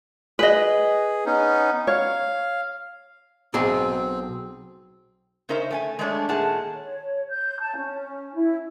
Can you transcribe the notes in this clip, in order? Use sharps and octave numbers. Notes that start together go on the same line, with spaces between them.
G#4 B4 D#5
B3 C#4 D#4
C#5 F5
B1 B2 C4 G#4
C#3 C#4 D#4 A#4 C5 E5
A3 G5 G#5
G#3 A3 C#4 D4 B4 C#5
A#2 D#3 G#4 F#5 A5
C#5
G6
A5
C#4
E4